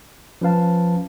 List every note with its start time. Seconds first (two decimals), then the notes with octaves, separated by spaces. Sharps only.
0.41 F3 C#4 B4 F5 A5